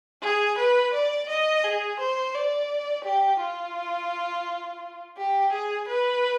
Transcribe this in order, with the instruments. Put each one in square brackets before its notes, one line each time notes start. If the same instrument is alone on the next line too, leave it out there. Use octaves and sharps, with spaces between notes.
[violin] G#4
B4
D5
D#5
G#4
C5
D5
G4
F4
G4
G#4
B4